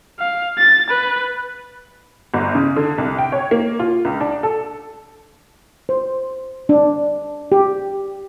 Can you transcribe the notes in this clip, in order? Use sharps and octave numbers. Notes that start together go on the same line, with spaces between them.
F5
A6
B4
G1
C#3
D3
C2
G5
C#5
A#3
F4
C#2
D4
A4
C5
D4
G4